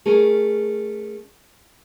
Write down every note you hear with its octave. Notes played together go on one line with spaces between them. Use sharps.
A3 C#4 G#4 A#4